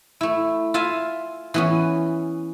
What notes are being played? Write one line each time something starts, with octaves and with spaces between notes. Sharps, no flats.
A3 E4
F4 E5 G#5
E3 B3 C#4